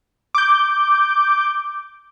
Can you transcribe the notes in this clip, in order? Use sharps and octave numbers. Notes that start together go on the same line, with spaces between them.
D6 G6